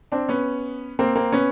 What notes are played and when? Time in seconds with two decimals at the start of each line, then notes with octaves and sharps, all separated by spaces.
0.12 C4 D4
0.28 B3 C#4
0.99 A#3 C4
1.16 A#3 C4
1.32 B3 C#4